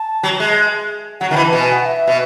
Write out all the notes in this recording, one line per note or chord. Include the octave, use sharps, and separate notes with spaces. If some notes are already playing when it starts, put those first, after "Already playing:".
Already playing: A5
F#3
G#3
F#3 F#5
D#3
E3 B5
A5
B2
G#5
F#5
E5
B2